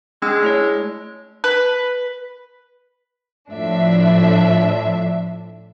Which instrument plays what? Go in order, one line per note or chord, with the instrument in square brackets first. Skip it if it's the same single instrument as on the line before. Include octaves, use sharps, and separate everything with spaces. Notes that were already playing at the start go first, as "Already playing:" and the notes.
[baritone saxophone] G#3 [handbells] C#4 D4 E6
[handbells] A3 E4 C#5
[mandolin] B4
[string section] A2 F3 D4 E5